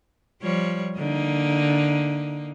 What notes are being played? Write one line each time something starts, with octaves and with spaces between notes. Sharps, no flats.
F3 G3 C#5
D3 A#3 D#4